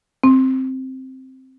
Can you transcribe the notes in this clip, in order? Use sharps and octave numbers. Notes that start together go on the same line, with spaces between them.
C4